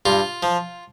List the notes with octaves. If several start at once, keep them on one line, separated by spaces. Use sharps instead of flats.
G2 F4
F3